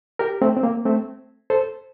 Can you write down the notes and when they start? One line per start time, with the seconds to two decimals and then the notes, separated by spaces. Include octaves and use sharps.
0.19 G4 A#4
0.42 A3 C4
0.57 C4
0.63 A#3
0.85 A3 C4
1.50 A4 C5